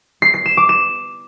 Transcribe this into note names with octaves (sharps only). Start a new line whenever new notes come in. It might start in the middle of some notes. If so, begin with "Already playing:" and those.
C7
C7
E7
D6
E7